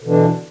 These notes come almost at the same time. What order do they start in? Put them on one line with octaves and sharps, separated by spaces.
D3 B2 E3 D4